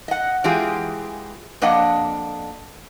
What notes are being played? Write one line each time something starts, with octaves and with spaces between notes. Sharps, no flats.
D#5 F#5
E3 G#3 F4 G4 G#4
F2 A#3 D4 D#5 F#5